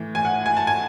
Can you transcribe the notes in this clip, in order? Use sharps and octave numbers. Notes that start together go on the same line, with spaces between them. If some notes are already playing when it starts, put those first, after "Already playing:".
Already playing: A2 E3
G#5
F#5
G#5
A5
G#5